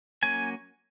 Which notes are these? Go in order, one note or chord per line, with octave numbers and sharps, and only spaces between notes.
F#3 A#3 C#4 G#5